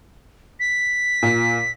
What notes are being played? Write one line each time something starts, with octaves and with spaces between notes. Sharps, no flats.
B6
A#2